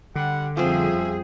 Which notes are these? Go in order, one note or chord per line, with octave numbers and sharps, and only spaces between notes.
D3 G3 F#5
F2 F3 G3 C4 C#4 F4 G#4 E5